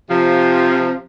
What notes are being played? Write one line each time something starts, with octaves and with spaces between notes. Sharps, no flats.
C3 F3